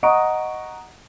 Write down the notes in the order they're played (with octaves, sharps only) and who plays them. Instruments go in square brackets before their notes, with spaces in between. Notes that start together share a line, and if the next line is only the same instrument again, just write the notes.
[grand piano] D#5 F#5 A#5 C#6 D#6 D7